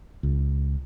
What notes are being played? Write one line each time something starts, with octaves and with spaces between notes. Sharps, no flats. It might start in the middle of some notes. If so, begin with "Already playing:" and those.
C#2